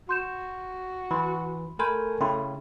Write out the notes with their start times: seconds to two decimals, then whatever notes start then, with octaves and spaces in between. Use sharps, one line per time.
0.09 F#4 C6 G6 E7
1.11 E3 B5 C6
1.79 A3 A4 A#4 G#5 B5 C6 G6
2.21 C#3 E4 G5 B5 C6